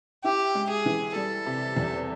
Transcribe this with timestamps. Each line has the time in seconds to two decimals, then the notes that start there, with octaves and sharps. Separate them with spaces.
0.24 E4 G4
0.55 G#3
0.70 G#4
0.86 E3
1.15 G3 A4
1.46 C3
1.76 E2